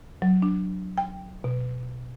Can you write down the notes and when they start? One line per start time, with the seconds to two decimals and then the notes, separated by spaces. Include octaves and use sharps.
0.22 F#3
0.42 D4
0.98 G5
1.44 B2